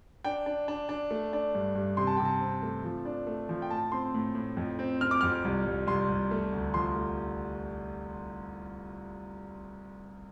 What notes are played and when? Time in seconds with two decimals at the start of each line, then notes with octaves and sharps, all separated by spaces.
0.24 D4 G5
0.46 D4
0.68 D4
0.89 D4
1.11 A3
1.33 D4
1.55 G2
1.75 G2
1.97 C3 C6
2.07 A5
2.17 C3 G5
2.25 A5
2.41 C4
2.63 A3
2.84 F3
3.05 D4
3.27 A3
3.49 F3
3.62 G5
3.70 A2 A5
3.92 C4 C6
4.14 A2
4.35 A2
4.57 F2
4.79 C4
5.01 C4 F6
5.11 D6
5.21 F2 F6
5.45 C2
5.66 C2
5.87 C2 C6
6.09 C2
6.31 A3
6.53 D2
6.74 F3 C6
6.96 A3